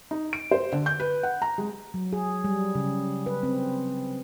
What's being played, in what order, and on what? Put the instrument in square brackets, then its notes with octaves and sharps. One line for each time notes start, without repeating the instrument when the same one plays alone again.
[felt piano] D#4
D7
C5
D3
G6
B4
F#5
A#5
G#3
[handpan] F#3
G#4
G3
C#3
B4
C4